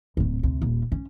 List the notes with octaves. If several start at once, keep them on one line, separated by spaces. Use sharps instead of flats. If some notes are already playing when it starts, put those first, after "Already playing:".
D1 C3
D2 C3
D#1
C#4